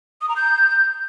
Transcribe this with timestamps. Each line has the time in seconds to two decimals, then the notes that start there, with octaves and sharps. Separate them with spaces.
0.22 D#6
0.29 A#5
0.36 G6